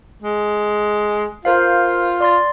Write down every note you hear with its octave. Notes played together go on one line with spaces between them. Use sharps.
G#3
F4 A#4 C5 F5
D5 C6 A6